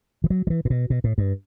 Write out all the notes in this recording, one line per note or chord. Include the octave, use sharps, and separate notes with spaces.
E3
F#3
F#3
E3
A2
B2
B2
A2
G2